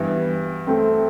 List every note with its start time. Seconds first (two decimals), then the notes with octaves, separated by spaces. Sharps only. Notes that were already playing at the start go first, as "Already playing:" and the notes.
Already playing: G2 E3 B3
0.67 A3 C4